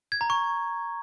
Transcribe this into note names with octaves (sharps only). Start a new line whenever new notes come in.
G#6
A#5
C#6